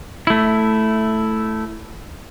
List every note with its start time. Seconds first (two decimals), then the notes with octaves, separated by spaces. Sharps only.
0.27 A3 E4